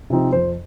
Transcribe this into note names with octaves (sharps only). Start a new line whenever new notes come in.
C3 F3 C4 D#4
F2 C5